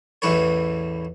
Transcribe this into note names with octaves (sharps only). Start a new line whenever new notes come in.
A1 E2 E3 B4 C#5